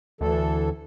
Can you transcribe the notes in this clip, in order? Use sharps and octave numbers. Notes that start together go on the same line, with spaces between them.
D2 E3 A4